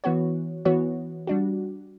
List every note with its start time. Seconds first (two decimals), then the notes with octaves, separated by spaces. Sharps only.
0.04 E3 B3 F#4 C#5
0.65 E3 B3 F#4 C#5
1.27 G3 D4 F#4